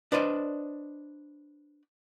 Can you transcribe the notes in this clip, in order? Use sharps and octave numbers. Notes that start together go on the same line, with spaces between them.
D4 B4 C5 D5 D#5